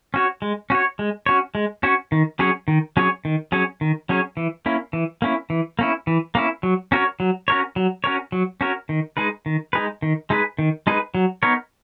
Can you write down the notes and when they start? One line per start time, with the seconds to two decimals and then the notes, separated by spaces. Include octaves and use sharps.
0.14 C#4 F#4 C#5
0.42 G#3
0.70 C#4 F#4 C#5
0.99 G#3
1.26 C#4 F#4 C#5
1.55 G#3
1.83 C#4 F#4 C#5
2.12 D#3
2.39 F#3 C#4 G#4 C#5
2.68 D#3
2.97 F#3 C#4 G#4 C#5
3.25 D#3
3.52 F#3 C#4 G#4 C#5
3.81 D#3
4.09 F#3 C#4 G#4 C#5
4.37 E3
4.66 A#3 C#4 E4
4.93 E3
5.22 A#3 C#4 E4
5.50 E3
5.79 A#3 C#4 E4
6.07 E3
6.35 A#3 C#4 E4
6.63 F#3
6.92 C#4 F#4 A#4 C#5
7.20 F#3
7.48 C#4 F#4 A#4 C#5
7.76 F#3
8.04 C#4 F#4 A#4 C#5
8.32 F#3
8.61 C#4 F#4 A#4 C#5
8.89 D#3
9.17 G#3 D#4 G#4 B4
9.46 D#3
9.73 G#3 D#4 G#4 B4
10.02 D#3
10.30 G#3 D#4 G#4 B4
10.59 D#3
10.87 G#3 D#4 G#4 B4
11.15 F#3
11.43 B3 D#4 A#4 C#5